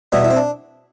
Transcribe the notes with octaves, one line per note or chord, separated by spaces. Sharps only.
E2 B2 G3 B3 E4
E4
C4
D4